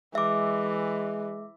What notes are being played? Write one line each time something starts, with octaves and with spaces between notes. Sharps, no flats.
E3 G#3 E5 D6